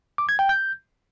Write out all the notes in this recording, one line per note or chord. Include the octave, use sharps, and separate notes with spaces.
D6
G#6
G5
G6